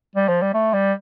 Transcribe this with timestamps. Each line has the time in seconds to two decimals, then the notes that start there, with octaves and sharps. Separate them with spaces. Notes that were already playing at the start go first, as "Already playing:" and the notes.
0.16 G3
0.28 F3
0.42 G3
0.54 A3
0.73 G3